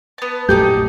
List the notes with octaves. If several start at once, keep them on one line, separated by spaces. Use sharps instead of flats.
B3 A5
A#1 F#2 A3 D#4 G4 A4 D6 G6